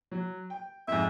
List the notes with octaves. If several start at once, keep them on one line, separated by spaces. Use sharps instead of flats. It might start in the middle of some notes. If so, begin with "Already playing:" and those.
F#3
G5
F2 G#2 E5